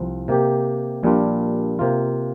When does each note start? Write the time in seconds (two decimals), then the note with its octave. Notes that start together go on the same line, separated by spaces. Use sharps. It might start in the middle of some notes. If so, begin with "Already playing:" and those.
Already playing: C2 F3
0.28 C3 A#3 G4
1.03 A#1 A#2 G3 D4 F4
1.79 C3 A#3 F4